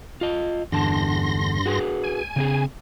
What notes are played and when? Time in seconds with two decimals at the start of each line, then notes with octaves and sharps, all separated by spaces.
0.21 F4 D#5
0.72 E2 G2 D3 A5 C6 A#6
1.66 F#4 G#4 B4
2.04 G#5
2.36 C#3 C4 G#4